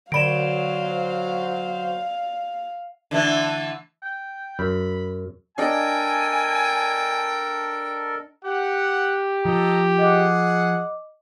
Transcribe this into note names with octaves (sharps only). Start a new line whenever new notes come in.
D3 F#3 C5 D5 F5 B5 D7 E7
D3 E3 A3
G5
F#2 B5
D4 A4 A#4 D#5 G5 G#5
G4 F#5
F3 A4 D#5 A#5
G#4 D#5 F#5 D6